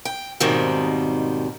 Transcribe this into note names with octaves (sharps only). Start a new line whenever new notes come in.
G5
D#2 G#2 B2 D#3 G3 C4